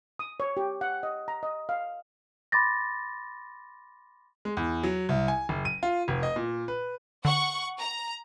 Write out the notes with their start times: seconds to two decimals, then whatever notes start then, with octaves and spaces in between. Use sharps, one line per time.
0.19 D#6
0.40 C#5
0.57 G4
0.81 F#5
1.03 D#5
1.28 A#5
1.43 D#5
1.69 F5
2.52 B5 C6 D6 A6 A#6
4.45 G#3
4.57 E2
4.83 F#3
5.09 C2
5.28 G#5
5.49 F#1
5.65 D#7
5.83 F4
6.08 F1
6.23 D#5
6.36 A#2
6.68 B4
7.25 D3 F#5 C#6
7.79 A#5